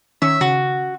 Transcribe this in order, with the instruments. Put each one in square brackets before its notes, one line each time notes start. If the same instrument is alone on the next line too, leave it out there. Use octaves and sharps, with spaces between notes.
[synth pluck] D#3 C#4 C#5 [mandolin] E5
[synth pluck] C#3 [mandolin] F#4